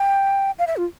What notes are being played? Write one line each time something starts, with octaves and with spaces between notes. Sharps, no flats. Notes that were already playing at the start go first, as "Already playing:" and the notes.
Already playing: G5
F5
E5
F4